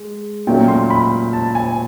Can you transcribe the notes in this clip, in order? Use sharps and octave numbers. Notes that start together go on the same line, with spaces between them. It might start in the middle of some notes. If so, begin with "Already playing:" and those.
Already playing: G#3
A#2 F#3 A3 C#4 G5
C6
B5
A5
G#5